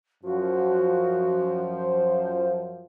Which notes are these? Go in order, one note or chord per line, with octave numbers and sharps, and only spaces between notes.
F#2 F3 F#4
C5